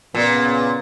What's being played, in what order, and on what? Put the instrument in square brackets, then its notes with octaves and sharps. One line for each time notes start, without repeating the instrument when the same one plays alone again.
[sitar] A#2 [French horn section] C#3 B3